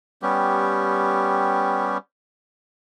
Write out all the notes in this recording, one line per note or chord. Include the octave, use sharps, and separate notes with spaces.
G3 B3 C#4 G4